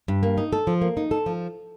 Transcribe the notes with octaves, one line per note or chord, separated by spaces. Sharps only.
G2
A#3
D#4
A4
F3
A#3
D#4
A4
F3